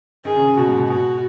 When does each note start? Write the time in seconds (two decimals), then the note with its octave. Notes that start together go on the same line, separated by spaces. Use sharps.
0.25 D#3 G#4
0.36 C#3
0.47 C#3
0.57 B2 F#4
0.68 G#2
0.78 B2
0.90 B2 F#4